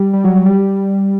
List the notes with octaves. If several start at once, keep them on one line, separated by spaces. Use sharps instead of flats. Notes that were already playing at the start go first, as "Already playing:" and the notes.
Already playing: G3
G3
F#3
F#3
G3